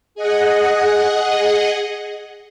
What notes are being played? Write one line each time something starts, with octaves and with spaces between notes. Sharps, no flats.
G#4 D#5 F#5